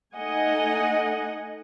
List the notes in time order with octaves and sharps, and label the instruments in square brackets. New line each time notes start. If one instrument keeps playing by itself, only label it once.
[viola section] A3 D#4 D#5 F#5 G#5